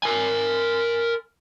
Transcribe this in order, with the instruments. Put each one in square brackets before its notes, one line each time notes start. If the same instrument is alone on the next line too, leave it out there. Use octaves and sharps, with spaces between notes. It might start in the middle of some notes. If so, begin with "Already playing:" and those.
[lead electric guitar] A#4 G#5